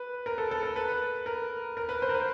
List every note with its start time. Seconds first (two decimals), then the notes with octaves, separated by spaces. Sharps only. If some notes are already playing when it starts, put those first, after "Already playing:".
Already playing: B4
0.26 A#4
0.38 A4
0.51 A4
0.63 A#4
0.76 B4
1.26 A#4
1.77 A#4
1.89 B4
2.02 C5
2.09 A#4
2.14 B4